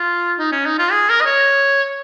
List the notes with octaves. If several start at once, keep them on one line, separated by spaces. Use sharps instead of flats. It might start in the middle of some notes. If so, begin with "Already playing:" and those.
Already playing: F4
D#4
C#4
D#4
F4
G#4
A#4
D#5
C#5